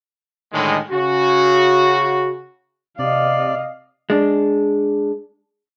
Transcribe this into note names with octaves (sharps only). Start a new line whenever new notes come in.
A2 D3 D#3 G#3
C#3 F#4
C3 D5 D#5 F5
G#3 D4